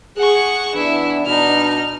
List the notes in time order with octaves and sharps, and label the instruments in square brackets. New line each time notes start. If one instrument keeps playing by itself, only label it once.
[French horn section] G#4 [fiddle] F#5 C#6
[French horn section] E3 B3 D4 [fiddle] E4
[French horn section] B2 D4 [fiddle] D#4 F6